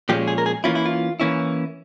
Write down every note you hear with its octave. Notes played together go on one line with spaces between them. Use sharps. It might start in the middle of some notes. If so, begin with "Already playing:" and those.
A#2 F3 G#3 C#4 G4
G#4
A#4
G#4
E3 A#3 C#4 E4 F4
E4
F4
E3 A#3 C#4 E4